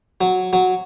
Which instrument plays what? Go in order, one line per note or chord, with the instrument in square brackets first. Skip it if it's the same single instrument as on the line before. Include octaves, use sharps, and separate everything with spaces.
[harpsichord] F#3
F#3